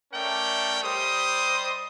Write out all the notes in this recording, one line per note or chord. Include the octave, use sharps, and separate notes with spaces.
A3 C#4 A#4 D5 G5
G3 G4 C5 D#5 D#6